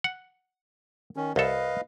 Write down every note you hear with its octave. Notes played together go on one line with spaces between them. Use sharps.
F#5
D#3 C#4
C2 A4 B4 D#5 F5